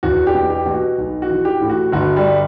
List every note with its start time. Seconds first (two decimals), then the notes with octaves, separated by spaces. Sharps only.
0.03 E2 F#4
0.27 G4
0.35 B2
0.50 G4
0.66 B2
0.74 F#4
0.98 B1
1.22 F#4
1.30 E3
1.45 G4
1.61 A2
1.69 F#4
1.92 G1 F#4
2.16 G3